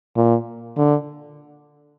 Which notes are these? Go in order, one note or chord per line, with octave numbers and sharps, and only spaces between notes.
A#2
D3